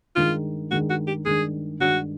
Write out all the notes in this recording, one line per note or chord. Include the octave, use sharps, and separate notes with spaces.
G2 D#3 G#3 F4
G2 D#3 G#3 F#4
F#4
G4
G2 D#3 G#3 G#4
G2 D#3 G#3 F#4